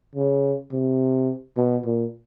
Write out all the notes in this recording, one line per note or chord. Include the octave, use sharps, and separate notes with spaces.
C#3
C3
B2
A#2